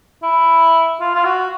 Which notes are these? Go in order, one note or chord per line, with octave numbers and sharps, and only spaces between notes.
E4
F4
F4
F#4